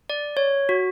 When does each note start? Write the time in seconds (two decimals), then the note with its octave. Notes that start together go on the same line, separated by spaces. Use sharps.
0.10 D5
0.37 C#5
0.69 F#4